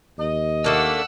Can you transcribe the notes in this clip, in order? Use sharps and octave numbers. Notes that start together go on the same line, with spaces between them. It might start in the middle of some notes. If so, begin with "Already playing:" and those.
D#2 D#5
A3 A#3 D4 F#5 E6